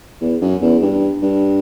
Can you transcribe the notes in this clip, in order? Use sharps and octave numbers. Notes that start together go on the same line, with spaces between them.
E2
F#2
E2
G2
G2